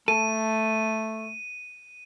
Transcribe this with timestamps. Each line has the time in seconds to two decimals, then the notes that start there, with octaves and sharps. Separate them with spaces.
0.08 A3 A4 D#7